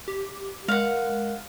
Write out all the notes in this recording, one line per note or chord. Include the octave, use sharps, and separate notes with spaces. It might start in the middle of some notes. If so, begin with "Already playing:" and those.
G4
G#3 A#4 F5 F#5